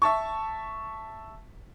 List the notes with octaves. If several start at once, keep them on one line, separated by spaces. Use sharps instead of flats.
E5 A5 C#6